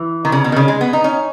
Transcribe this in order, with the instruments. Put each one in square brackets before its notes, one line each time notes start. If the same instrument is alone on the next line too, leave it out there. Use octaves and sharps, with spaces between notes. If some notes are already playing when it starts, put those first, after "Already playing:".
Already playing: [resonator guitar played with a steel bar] E3
D#3
C#3
B2
D#3
C#3
G#3
B3
D#4
C#4